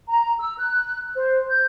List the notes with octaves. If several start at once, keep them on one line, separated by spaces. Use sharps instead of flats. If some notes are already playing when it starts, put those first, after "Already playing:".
A#5
E6
F#6
C5
G6